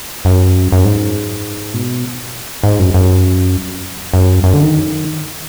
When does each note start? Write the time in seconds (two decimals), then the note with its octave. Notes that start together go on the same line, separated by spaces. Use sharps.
0.25 F#2
0.72 F#2
0.85 G#2
1.74 B2
2.63 G#2
2.79 F#2
2.94 F#2
4.13 F#2
4.44 F#2
4.54 D3
4.63 D#3